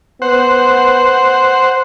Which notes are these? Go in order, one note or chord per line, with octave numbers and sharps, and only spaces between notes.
B3 C5 F#5